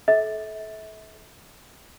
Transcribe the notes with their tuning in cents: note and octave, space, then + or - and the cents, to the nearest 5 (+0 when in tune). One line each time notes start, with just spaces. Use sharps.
A4 -30 E5 -35